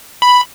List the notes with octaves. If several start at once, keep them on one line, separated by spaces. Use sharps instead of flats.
B5